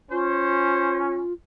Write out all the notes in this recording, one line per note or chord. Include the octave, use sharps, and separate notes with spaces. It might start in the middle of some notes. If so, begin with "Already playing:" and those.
C#4 F4 C5